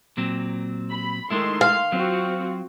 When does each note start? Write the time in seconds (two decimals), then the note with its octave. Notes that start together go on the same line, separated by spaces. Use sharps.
0.17 A#2 F#3 C4
0.92 B5
1.30 D#3 G#3 A3 E4 C6
1.61 F5
1.92 F#3 C4 F4 F#4